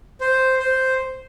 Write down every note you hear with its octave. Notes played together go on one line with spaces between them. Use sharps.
C5
C5